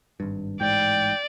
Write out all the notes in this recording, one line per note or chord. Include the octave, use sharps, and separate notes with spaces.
G#1 G2
A1 G#2 D5 G5